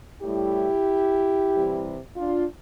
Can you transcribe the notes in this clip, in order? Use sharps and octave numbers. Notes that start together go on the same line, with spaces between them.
A2 G3 E4 G4
C3 E3 G3
D4 F4